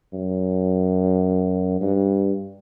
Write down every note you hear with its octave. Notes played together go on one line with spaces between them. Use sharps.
F#2
G2